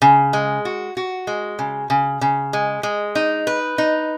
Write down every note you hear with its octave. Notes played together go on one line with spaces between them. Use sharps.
C#3
G#3
F#4
F#4
G#3
C#3
C#3
C#3
G#3
G#3
D#4
B4
D#4